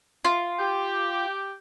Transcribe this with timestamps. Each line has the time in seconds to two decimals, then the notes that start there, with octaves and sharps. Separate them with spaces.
0.25 F4
0.59 G4